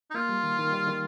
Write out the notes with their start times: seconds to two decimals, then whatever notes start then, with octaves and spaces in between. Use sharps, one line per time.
0.10 D#4
0.14 A#3 F4
0.29 G3
0.43 D#3
0.59 D#3
0.72 G3
0.87 D#3